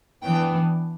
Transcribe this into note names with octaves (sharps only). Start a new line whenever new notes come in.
E3 B3 D4 G5